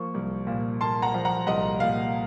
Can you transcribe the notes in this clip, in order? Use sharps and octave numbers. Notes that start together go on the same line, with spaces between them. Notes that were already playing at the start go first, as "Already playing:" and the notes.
Already playing: F3 A#3 C#6
C2
A#2
A#3 A5 C6
F#5 A#5
F3
F#5 A#5
C2 D#5 F#5
A#2 F5